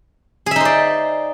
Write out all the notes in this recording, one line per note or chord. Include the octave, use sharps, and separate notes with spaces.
D#4 G#4 C5 D5 E5